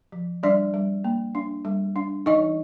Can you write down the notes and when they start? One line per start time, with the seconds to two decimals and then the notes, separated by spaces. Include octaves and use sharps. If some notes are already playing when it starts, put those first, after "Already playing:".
0.12 F3
0.43 G3 D4 D5
0.74 G3
1.04 A#3
1.35 D4
1.65 G3
1.96 D4
2.26 E3 D#4 D#5